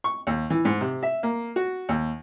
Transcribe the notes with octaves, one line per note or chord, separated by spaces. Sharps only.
C#6
D#2
E3
G#2
C3
E5
A#3
F#4
D#2